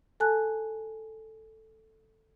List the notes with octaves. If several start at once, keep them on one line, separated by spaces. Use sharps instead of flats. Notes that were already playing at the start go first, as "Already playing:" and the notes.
A4 G#5 A5 F#6